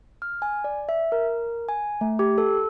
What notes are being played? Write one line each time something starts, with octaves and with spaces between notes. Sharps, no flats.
F6
G#5
D5
E5
A#4
G#5
A3
G4
A4